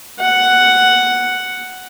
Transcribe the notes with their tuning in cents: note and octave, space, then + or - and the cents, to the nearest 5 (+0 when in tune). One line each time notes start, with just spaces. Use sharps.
F#5 +5